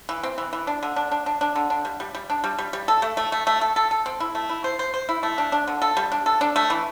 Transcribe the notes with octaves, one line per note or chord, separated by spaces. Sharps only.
E3
C4
E3
E3
D4
D3
D4
D4
D4
D4
D3
D4
G3
G3
G3
D4
G3
G3
G3
A4
A3
A3
A3
A3
A4
A4
A4
C4
E4
A3
E4
C5
C5
C5
E4
A3
D4
D4
D3
A4
G3
D4
A4
D4
A3
E3